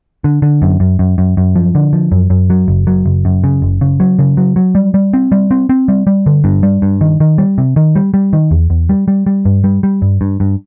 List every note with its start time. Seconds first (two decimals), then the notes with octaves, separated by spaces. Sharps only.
0.24 D3
0.42 D3
0.62 F#2
0.80 F#2
0.99 F#2
1.18 F#2
1.37 F#2
1.56 F3
1.75 D3
1.93 F3
2.12 F#2
2.30 F#2
2.50 F#3
2.68 F#1
2.87 F#3
3.06 F#1
3.25 F#2
3.44 C#3
3.62 F#1
3.81 C#3
4.00 F#3
4.19 C#3
4.37 F#3
4.56 F#3
4.75 G3
4.94 G3
5.13 C4
5.32 G3
5.51 C4
5.69 C4
5.88 G3
6.07 G3
6.26 D3
6.44 G2
6.63 G3
6.82 G2
7.01 D#3
7.20 D#3
7.38 G3
7.58 C3
7.76 D#3
7.96 G3
8.14 G3
8.33 D#3
8.51 E2
8.70 E2
8.89 G3
9.08 G3
9.26 G3
9.45 G2
9.64 G3
9.83 G3
10.02 G2
10.21 G2
10.40 G2